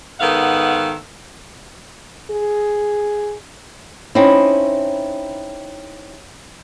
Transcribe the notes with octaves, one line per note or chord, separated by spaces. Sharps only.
G#2 D#3 B3 A4 F5 F#5
G#4
C4 C#4 D#4 E4